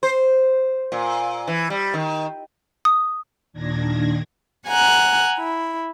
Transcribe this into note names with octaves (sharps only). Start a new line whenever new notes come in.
C5
A#2
E3
G3
D#3
D#6
D#2 A#2 D#3 D4 G#6 A#6
F#5 G#5 A#5 F#6
E4